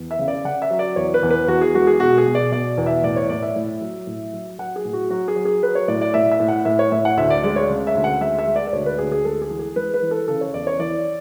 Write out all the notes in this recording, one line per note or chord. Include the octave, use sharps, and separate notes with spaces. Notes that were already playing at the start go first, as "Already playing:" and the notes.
Already playing: E2
E5
C#3
D5
C#3 F#5
E5
F#3
D5
E2 C#5
B4
E2
B4
E2 F#4
G#4
G#3 F#4
G#4
B2 F#4
G#4
B2
D5
B2 D5
E2
E5
A2 D5
C#5
A2 D5
E5
A2
F#3
A2
F#3
F#3 F#5
G#4
A2
F#4
F#3 F#4
G#4
F#3
G#4
F#3 B4
C#5
A2 D5
D5
A2 E5
E5
A2
F#5
A2 E5
C#5
A2 E5
F#5
D2 E5
D5
G#3 D5
C#5
C#3
E5
D2
F#5
G#3 E5
E5
G#3
D5
D5
D2 C#5
B4
D2 G#4
G#4
G#3 A4
G#4
E3
G#4
G#3 B4
B4
E3
A4
C#3 A4
C#5
E2 D5
C#5
E3 D5